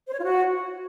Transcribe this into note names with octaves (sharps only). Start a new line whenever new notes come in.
C5
C#5
F4
F#4